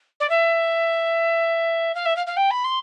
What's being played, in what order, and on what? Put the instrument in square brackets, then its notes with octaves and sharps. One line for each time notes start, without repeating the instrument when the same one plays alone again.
[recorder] D5
E5
F5
E5
F5
F5
G5
B5
C6